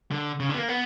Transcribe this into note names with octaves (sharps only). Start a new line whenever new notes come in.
D3
C#3
D3
B3
A#3
B3